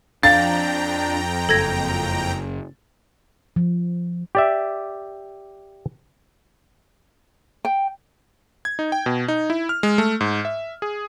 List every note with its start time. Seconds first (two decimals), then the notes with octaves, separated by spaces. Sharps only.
0.23 F2 D4 F5 G5 A#5 A6
1.49 F#1 A4 G#6 A#6
3.56 F3
4.35 G4 D5 E5
7.65 G5
8.65 G#6
8.79 D#4
8.92 G5
9.06 B2
9.28 D#4
9.50 E4
9.69 F6
9.83 G#3
9.98 A3
10.21 G#2
10.45 E5
10.82 G#4